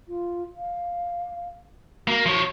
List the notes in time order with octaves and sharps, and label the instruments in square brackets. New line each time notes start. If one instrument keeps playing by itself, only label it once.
[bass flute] F4
F5
[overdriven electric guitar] A#3 [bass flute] F#4
[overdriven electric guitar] F3 C#5